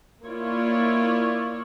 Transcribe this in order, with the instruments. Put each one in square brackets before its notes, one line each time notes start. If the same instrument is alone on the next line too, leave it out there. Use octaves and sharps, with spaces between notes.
[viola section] A#3 E4 F4 C#5 D5